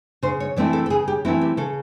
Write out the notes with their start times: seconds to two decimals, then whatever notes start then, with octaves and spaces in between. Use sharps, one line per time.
0.23 C#3 C5
0.40 C#5
0.56 E3 A3 C4 E4 D5
0.73 A4
0.86 A4
0.90 C#3 G#4
1.08 G4
1.25 E3 A3 C4 E4 F#4
1.41 G4
1.57 C#3 A4